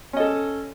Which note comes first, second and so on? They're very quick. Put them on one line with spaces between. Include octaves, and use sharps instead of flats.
C#4 D#5 A4